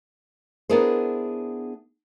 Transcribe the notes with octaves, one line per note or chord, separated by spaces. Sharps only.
B3 D4 E4 G#4 A#4 C5